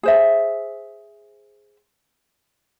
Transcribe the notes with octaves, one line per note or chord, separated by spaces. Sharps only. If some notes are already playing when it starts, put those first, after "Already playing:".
G#4 C5 E5